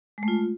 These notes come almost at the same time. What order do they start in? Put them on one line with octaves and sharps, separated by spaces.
G#3 A3 F4